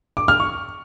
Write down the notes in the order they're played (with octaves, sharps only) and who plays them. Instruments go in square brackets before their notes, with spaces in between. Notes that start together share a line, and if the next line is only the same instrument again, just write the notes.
[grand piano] D6
F6
C#6